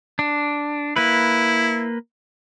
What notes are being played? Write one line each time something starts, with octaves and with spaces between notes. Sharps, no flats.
D4
A#3 E4 B4